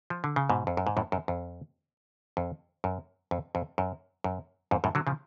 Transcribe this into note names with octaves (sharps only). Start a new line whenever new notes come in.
F3
D3
C#3
G#2 B2
F2
F#2
G#2
F#2 A2
F#2
F2
F2
F#2
F2
F2
F#2
F#2
F2 G#2
F#2 A2
D3 F#3
C#3 F3